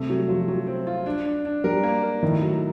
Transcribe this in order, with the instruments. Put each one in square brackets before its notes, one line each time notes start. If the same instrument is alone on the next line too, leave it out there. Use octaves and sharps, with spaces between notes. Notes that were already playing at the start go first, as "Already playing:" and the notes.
Already playing: [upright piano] C3 [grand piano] G3 A3
[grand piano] F#3
[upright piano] F3 [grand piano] F#3
[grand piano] F#3
C4
F4
D4
D4
D4
[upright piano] G3 [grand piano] A#4
[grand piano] A#3
A#4
[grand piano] A2 [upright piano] D#3
[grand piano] F#3